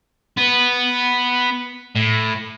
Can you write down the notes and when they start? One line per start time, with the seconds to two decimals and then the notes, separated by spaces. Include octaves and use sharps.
0.37 B3 B4
1.96 A2